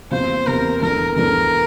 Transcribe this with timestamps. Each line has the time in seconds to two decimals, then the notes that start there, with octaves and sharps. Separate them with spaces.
0.11 E2 C3 E3 A#3 F4 C5
0.47 E2 C3 E3 A#3 F4 A#4
0.81 E2 E3 A3 D4 A#4
1.16 E2 E3 A3 D4 A#4